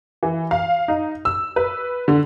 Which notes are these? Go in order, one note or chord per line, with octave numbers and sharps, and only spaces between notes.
E3
F5
D#4
E6
B4
D3